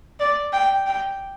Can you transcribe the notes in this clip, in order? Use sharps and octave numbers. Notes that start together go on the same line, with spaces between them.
D5
G5
G5